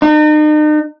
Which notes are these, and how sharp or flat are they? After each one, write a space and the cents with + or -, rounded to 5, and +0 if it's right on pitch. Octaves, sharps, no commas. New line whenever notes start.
D#4 -40